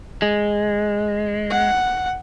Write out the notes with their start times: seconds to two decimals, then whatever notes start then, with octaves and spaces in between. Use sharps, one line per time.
0.22 G#3
1.50 F#5